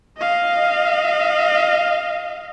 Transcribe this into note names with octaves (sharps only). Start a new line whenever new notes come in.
D#5 F5